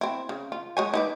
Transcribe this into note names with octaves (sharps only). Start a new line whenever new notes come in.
C4 E4
C#3
F4
G#3 C#5 G#5
D#4 B4 D5